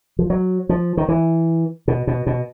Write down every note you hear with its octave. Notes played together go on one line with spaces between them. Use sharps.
F3
F#3
F3
D#3
E3
B2
B2
B2